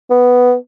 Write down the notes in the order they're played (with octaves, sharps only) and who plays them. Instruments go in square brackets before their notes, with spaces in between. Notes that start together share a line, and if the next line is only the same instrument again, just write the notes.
[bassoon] B3